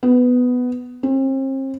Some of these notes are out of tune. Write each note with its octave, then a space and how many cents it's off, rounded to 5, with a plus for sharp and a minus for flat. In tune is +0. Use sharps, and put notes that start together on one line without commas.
B3 +10
C4 +40